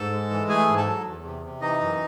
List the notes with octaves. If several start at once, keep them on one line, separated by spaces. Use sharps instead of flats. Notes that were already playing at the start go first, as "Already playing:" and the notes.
Already playing: G#2 A4 A5
G#3
E3
A3 G#4 G#5
G#2
A4 A5
F#3
E2
C3
C3
E3 D#4 D#5
F#2